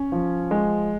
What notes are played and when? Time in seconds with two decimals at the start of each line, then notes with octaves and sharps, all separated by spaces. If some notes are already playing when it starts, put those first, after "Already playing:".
Already playing: C#4
0.12 F3
0.51 G#3